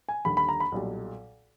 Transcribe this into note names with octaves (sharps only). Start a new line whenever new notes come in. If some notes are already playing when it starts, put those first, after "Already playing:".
G#5
D#2 D3 G3 B5
B5
A#5
B5
B1 A#2 G3